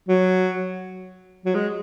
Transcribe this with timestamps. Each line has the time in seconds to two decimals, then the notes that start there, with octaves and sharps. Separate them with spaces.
0.09 F#3
1.45 F#3
1.55 G#3